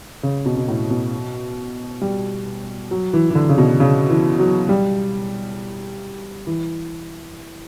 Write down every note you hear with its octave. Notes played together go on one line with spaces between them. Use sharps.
C#3
B2
B2
A2
B2
G3
F#3
E3
E3
D3
C#3
B2
C#3
E3
F#3
G3
E3